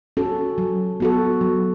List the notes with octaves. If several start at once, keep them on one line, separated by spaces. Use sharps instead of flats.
C#4 F#4 A4
F#3
B3 F#4 A4
F#3